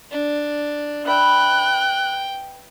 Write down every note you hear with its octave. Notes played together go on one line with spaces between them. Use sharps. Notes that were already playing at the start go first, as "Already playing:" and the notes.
D4
B4 E5 G5 B5 F#6